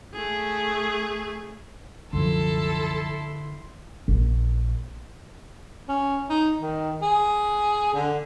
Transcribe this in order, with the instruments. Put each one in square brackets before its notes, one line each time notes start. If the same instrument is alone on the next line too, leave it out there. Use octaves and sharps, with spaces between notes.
[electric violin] A3 G#4
[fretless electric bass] C2 F#2 F3 [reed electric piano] D3 [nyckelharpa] E4 C6 [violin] A4
[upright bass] A#1
[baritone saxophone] C#4
D#4
D#3
G#4
D3